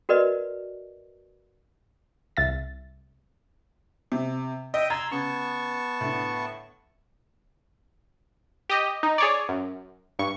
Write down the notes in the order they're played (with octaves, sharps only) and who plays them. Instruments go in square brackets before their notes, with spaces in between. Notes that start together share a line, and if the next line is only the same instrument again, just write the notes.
[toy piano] F#4 A#4 B4 D5 D#5
[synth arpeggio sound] C2 E5 A6
[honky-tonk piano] C3
[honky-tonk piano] D#5 [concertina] E5 G5 D#6
[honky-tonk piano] A#5 G#6 A6 [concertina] C6 E6
[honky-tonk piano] C#3 [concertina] B3 A5 C#6
[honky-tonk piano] A2 D3
[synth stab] G4 D#5
D#4
G#4 C#5 D5
F#2
G2 C#6